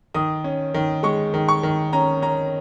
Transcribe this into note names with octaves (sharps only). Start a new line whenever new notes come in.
D#3 D#6
C#4
D#3
G#3 C#6
D#3
C#6
D#3
C#4 A#5
C#4 A#5